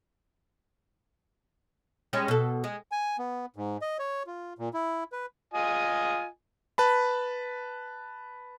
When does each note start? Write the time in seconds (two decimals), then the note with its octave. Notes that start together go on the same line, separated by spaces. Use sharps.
2.13 G3 G#3 C#4
2.28 B2 A4
2.64 G#3
2.92 G#5
3.19 B3
3.56 G#2
3.82 D#5
3.99 C#5
4.27 F4
4.59 A#2
4.74 E4
5.12 B4
5.54 F4 D#5 G#5
6.78 B4 A5 B5